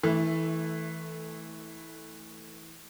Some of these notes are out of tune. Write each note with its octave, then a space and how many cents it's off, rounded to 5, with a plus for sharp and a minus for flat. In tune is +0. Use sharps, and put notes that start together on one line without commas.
E3 -20 A3 +0